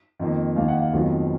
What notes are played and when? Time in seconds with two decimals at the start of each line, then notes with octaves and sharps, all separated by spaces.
0.20 F2 D#3 A#3
0.56 D#2 D#3 A#3 F5
0.68 F#5
0.80 F5
0.93 F1 F2 D#3 F#3 B3